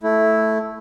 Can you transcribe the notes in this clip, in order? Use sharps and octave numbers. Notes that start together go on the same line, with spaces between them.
A3 E4